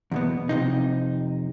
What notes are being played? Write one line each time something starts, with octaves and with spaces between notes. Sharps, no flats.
E2 B2 B3
F2 C3 D#4